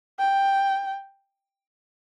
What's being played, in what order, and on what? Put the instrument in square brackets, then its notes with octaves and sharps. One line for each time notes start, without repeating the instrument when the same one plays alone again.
[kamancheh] G5